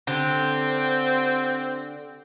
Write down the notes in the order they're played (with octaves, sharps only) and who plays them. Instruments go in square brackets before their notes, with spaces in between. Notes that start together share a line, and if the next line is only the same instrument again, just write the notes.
[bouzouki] D3 G4 [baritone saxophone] C4